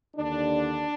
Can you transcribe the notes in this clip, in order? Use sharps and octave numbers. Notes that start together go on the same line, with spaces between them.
D#2 D3 D4